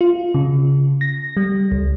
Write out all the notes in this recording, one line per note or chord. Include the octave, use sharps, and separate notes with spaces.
F4
C#3
A#6
G3
C#2